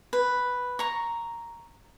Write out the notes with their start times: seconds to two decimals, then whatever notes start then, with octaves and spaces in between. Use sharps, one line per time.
0.13 B4
0.79 A#5 C#6